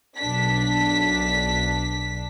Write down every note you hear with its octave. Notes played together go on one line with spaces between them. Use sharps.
B1 D4 B6